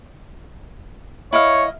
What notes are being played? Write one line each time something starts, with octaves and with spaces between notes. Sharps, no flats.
E4 C#5 D#5 F5